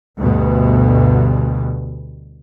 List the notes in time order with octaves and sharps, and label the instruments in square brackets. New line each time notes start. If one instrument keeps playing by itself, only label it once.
[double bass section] D2 G2 B2